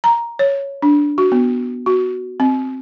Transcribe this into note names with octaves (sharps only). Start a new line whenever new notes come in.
A#5
C#5
D4
F#4
B3
F#4
C4